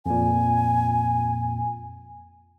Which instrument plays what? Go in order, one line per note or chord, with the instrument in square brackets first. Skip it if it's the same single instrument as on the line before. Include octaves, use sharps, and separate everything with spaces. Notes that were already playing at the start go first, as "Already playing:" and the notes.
[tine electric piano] F2 A#2 [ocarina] G#5